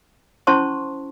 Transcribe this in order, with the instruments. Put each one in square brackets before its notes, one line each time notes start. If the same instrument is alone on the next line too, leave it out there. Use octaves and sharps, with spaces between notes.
[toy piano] C#4 E4 C5 A5 C6 C#6